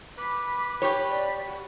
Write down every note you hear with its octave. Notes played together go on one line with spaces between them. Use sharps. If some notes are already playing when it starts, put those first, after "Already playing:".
B4 B5 D6
G4 C#5
D5
F#4